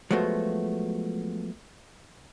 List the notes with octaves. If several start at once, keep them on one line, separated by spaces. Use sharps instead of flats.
F3 F#3 G#3 A3 B3 F#4